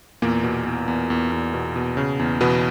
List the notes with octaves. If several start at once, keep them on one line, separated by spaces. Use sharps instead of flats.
E2 A#2 A#3
B2
E2
E2
E2
E2
B2
B2
C#3
E2
B2 E3 B3